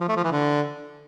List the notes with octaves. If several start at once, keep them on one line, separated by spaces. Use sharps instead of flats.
F3
A3
F3
E3
D3